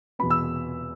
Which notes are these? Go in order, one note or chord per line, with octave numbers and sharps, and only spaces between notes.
E2 B2 B3 B5
E6